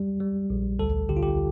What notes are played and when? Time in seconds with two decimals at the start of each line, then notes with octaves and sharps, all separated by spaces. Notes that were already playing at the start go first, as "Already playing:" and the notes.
Already playing: G3
0.20 G3
0.50 A#1
0.79 D2 A4
1.09 D3 G4
1.16 F4
1.23 G4